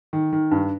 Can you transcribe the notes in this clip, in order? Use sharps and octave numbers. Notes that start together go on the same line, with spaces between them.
D#3
D#3
G2